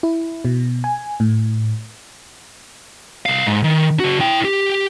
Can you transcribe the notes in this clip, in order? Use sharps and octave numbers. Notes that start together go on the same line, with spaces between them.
E4
B2
G#5
A2
C2 F5
G#2
D#3
C#3 F#4
E4 G5
G4